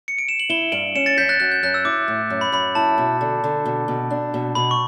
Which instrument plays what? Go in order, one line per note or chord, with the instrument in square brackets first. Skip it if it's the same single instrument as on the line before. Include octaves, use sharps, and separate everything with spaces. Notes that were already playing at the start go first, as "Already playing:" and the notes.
[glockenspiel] C#7
D7
E7
F#7
[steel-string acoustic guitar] E4 [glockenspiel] E7 G7
[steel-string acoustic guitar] G2 [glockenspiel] D7 F#7
[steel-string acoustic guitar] C#4 [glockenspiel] C#7 E7
[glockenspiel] A6 C#7
[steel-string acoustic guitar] F#2 [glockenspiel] G6 B6
[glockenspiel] F#6 A6
[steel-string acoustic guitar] F#2 [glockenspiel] F#6
[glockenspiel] G6
[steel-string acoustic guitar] F#2 [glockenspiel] F#6
[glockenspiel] E6
[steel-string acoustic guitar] E4 [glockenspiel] D6
[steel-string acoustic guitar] A2
F#2
[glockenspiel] B5
[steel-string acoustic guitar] F#2 [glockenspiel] B5
[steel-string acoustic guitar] E4 [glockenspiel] A5
[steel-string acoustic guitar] B2
D3
D3
B2
B2
D4
B2
[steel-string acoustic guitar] B2 [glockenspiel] B5
[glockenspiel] C#6